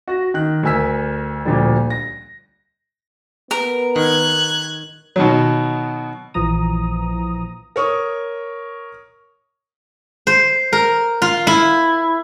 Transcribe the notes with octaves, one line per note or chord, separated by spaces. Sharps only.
F#4 A#6
D#3 F#6
D2 A#4 G#5 E6 B6
D2 A#2 D3 F3 G3
A#6
B3 A#4
D#3 F#6 G#6
B2 D#3 F#3
A#1 E3 F3 A#5 D#6
A#4 C#5 C#6 D#6
C5
A#4
F4
E4